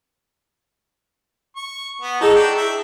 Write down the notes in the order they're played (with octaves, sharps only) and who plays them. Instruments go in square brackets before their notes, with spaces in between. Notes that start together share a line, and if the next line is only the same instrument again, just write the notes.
[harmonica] C#6
B3
[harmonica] D#4 A4 C#5 [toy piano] E4 G#4 D#6
[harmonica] D4 G5
E5